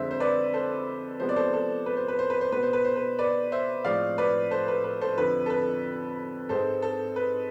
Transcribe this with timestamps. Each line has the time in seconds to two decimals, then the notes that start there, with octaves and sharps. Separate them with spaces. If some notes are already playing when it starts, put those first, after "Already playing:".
Already playing: F2 D3 G#3 C5 E5
0.11 C5
0.20 B4 D5
0.54 A4 C5
1.20 C3 F3 G#3 B3 C5
1.29 D5
1.36 A4 C5
1.53 A4
1.86 B4
1.97 C5
2.08 B4
2.19 C5
2.30 B4
2.41 C5
2.52 B2 B3 B4
2.63 C5
2.73 B4
2.85 C5
2.96 B4
3.19 B4 D5
3.52 C5 E5
3.84 A2 F3 G#3 C4 D5 F5
4.18 B4 D5
4.51 A4 C5
4.68 B4
4.84 B4
5.01 A4 C5
5.17 F2 D3 F3 B4
5.46 A4
5.50 B4
6.49 G#2 G#3 C4 A4 C5
6.82 A4
7.16 B4